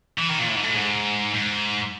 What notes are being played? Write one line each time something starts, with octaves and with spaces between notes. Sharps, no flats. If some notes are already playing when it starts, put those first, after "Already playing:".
E3
D#3
A#2
A2
G#2
A2
G#2
G#2